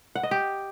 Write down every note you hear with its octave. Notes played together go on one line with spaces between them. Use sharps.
F#5
D#5
G4